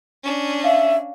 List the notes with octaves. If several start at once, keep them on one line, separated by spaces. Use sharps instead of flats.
C#4 D4
E5 F5